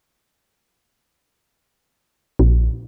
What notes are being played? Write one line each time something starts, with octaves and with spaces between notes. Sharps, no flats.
A#1